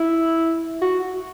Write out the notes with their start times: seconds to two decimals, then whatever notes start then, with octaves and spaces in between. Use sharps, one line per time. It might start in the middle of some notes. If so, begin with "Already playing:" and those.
Already playing: E4
0.82 F#4